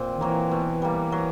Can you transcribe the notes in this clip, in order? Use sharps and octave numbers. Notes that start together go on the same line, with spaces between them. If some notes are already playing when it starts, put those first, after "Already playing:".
Already playing: A#2 C4
D#3
E3 F#3 A#3
B2
G3 A#3
F#3